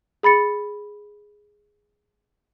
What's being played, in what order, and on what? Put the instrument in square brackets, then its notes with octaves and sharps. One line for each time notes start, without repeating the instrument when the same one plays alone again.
[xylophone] G#4 B5 A6 C#7